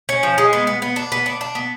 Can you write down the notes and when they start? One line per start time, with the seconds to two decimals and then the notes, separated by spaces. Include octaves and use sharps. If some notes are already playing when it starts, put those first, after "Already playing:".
0.09 C#4
0.23 F3
0.38 G#3
0.53 B3
0.67 B3
0.82 B3
0.96 D4
1.12 B3
1.26 D4
1.41 D4
1.55 B3